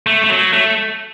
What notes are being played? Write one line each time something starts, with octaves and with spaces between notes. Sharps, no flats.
A3
A3
F#3
A3